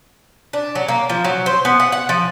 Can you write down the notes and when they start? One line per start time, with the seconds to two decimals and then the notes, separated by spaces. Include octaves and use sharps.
0.53 D4
0.75 F#3
0.88 A#3
1.09 F3
1.24 F#3
1.46 C5
1.65 B3
1.80 F#5
1.92 F#5
2.09 F3